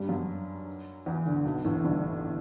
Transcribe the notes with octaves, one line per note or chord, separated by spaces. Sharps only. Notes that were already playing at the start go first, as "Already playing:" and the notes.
Already playing: G2 G3
F#2 F#3
E2 E3
D2 D3
B1 B2
A1 A2
G1 G2